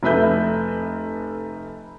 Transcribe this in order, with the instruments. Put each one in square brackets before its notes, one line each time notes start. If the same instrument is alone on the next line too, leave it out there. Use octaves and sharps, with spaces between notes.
[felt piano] F1 A3 B4 E5 G6